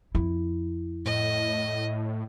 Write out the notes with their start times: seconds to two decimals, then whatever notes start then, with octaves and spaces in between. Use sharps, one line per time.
0.15 F2 E4
1.05 A2 D#5